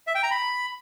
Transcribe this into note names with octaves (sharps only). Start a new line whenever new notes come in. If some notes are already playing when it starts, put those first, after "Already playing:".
E5
G5
A#5
B5